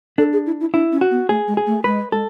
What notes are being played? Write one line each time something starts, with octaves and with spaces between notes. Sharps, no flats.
D4 A4
G#4
E4
E4
D4 E4
C#4
F#4
B3
A3 G#4
G#3
G#4
A3
G#3 B4
G#3 A4